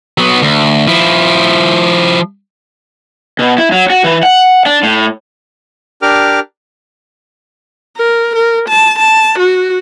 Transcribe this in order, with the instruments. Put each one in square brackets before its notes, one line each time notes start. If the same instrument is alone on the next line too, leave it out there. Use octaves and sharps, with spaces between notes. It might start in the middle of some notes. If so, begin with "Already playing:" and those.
[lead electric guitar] F#3 B3
D2
F3 E4
[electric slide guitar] B2
E4
F#3
F#4
E3
F#5
D4
A2
[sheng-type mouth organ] D4 G4 A#4 D6 F6
[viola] A#4
A#4
A5
A5
F#4